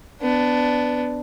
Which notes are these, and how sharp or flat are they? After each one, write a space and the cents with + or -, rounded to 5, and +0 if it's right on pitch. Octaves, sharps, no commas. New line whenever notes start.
B3 +20 D4 +0